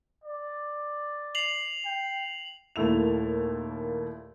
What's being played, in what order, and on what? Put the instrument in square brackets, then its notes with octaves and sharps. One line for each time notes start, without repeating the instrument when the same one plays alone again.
[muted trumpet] D5
[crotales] C7 F7 F#7
[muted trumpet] G5
[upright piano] D#2 A#2 A3 E4 F7